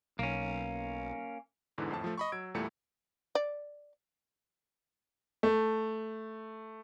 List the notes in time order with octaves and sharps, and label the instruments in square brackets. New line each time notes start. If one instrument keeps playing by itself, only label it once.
[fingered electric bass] B1 [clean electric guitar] A#3 C#4
[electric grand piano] E2 G#2 D3 E3
F2 A2 A5
F3 A3
D#5 B5 C#6
F#3 E6 G#6 D7
E2 A#2 G3 A3 E4 C#7
[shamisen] D5
[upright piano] A3